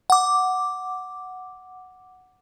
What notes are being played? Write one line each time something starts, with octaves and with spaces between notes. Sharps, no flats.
F#5 D6